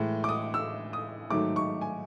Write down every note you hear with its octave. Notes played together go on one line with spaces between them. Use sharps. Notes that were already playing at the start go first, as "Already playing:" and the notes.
Already playing: A2 E3 G#3
D6
D#6
E6
D#6
G#2 D#3 F#3 A3 D6
C#6
G#5